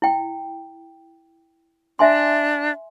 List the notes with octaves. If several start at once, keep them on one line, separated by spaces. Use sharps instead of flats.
E4 G5
D4 E5 G#5 C6